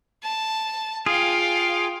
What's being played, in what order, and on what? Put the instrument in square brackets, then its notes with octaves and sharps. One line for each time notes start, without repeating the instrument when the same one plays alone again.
[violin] A5
[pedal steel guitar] F4 G#4 [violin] F5 G5